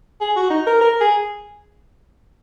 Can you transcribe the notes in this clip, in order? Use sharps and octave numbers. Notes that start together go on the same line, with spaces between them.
G#4
F#4
D#4
A#4
A#4
G#4